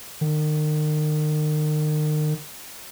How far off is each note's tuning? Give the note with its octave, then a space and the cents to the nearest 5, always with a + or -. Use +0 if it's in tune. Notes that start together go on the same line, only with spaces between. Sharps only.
D#3 -35